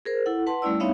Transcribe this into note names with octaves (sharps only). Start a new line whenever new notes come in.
G#4 A#4 C5
E4 A4 F#5
B4 F#5 A5 C6
G3 A3 C#4 E4 D5 E6
B3 C4 D#4 C#5 E5 F5